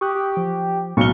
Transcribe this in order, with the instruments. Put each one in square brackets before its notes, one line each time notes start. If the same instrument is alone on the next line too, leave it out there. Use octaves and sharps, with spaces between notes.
[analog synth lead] G4 [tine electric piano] C#6 D#6 F#6
[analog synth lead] G4
[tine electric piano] F3
[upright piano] B1 G7 [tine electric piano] A2 A#3 F6 [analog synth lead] C#6